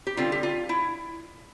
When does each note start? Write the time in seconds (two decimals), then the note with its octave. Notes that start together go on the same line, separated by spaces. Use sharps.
0.07 G4
0.17 D3 G3 C4 F4
0.32 G4
0.43 F4
0.69 E4